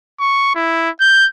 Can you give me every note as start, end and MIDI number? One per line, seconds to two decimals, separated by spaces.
0.20 0.50 85
0.55 0.89 64
1.00 1.26 91